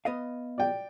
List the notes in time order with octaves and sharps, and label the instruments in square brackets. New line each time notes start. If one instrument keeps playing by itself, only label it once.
[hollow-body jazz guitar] B3 D#5 F5
[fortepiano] D5 G5